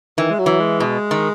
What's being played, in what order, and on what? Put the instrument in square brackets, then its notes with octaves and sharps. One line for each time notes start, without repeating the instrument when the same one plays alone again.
[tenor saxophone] D#3 [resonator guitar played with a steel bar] E3
[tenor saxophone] G#3
F#3
[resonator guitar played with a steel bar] E3
[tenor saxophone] G#3
[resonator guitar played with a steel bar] B2
D#3